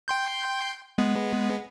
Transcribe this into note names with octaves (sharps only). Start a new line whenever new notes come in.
G5 C6 G6
G#3 B3